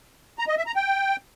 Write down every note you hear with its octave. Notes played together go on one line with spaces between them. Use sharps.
A#5
D#5
E5
A#5
G5